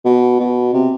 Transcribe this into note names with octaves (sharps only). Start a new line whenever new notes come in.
B2
B2
C3